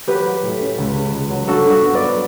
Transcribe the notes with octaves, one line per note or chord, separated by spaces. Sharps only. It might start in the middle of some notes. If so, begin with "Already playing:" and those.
F#3 G4 B4
F#3
A2
C#4
C#2
C#3
C#2
F#3
G2 F#4 A4
G2
F#4
B3
B4 D5
F#3